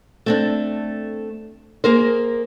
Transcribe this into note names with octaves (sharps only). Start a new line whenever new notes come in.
A3 C4 D4
A#3 G#4 A#4 C5